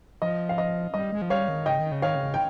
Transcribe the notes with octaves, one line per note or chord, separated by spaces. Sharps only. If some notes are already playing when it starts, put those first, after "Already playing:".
F3 D#5
F5
D#5
G3 D#5
G#3
F3
G3 C#5 F5
D#3
C#3 D#5 G5
D#3
C#3
D#3 C#5 F5
C#3
G5